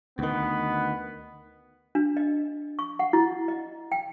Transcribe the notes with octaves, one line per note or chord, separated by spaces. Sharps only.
D2 D#3 B3
D4
D#5
C#6
F#5
E4
D#5
G5